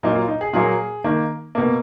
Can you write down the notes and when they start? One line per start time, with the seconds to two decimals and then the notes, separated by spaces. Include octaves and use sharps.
0.03 A#2 F#3 A#3 D#4
0.15 F4
0.28 D#4
0.41 G#4
0.53 A#2 F#3 A#3 G#4
1.04 D#3 A#3
1.55 B2 A#3